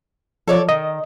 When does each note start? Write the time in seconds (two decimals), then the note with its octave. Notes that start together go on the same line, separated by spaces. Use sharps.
0.48 F3 A4 C#5 D5
0.69 D#3 D#5